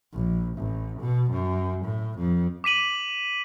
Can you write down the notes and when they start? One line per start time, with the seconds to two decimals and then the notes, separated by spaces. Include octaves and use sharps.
0.13 A#1
0.58 A1
1.00 B2
1.31 F#2
1.85 A2
2.18 F2
2.64 D6 B6 D#7 F#7